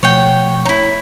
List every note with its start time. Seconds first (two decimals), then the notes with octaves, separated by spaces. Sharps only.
0.03 B2 F3 A3 C#5 F#5 G5
0.65 D#4 E4 C#5